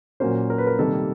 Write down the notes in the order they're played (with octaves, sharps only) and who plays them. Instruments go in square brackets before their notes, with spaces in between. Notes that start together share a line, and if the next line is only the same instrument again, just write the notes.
[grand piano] A#2 F#3 A#3 C#4 C5
A#4
B4
A#4
C3 D#3 G3 A#3 A4